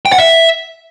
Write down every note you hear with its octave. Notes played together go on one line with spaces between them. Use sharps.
G5
F#5
E5